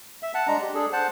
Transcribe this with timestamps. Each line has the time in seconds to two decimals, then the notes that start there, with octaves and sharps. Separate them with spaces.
0.23 E5
0.34 F#5 A5
0.47 G#3 D4 A#5
0.62 G4
0.75 D4 G#4 A4
0.93 C5 F#5 A5